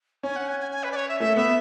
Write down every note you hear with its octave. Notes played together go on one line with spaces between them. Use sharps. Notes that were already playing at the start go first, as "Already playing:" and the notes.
C#4 G#5
F#5
G#5
G#5
G#5
B4
D5
C#5
E5
A3 E5
B3 E5